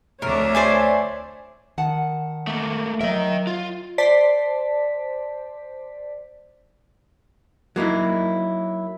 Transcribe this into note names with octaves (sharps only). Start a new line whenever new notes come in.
D2 D4 A#4 C#5 E5
C5 D5 G#5
D#3 F#5 A5
A3 A#3
F#3 A#4 D#5 E5
F4
C5 D5 A5 B6
F#3 A#3 D#4 E4